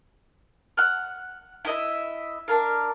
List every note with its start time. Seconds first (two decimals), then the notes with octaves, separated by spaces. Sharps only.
0.77 F#5 F6
1.65 E4 D#5 E5
2.48 D4 A#4 F5